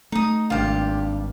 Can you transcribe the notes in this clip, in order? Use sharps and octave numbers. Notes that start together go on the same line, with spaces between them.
A3 D#4 D#6
G#1 G2 F4 G4 F6